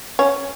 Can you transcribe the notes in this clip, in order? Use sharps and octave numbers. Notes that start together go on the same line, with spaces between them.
C#4